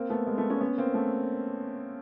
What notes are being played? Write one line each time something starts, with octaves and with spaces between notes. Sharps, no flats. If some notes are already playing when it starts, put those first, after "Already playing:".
Already playing: A#3 C4
A3 B3
G#3 A#3
A3 B3
B3 C#4
B3 C#4
A#3 C4
A3 B3